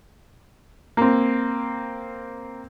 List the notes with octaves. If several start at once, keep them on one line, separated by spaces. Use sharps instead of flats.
A#3 C4